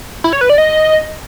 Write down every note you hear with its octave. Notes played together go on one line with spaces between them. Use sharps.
E4
C#5
B4
D5
D#5